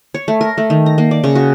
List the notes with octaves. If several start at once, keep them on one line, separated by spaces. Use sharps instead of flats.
C#5
A3
A#4
A3
D#3
A#5
A#3
D5
C#3
F#4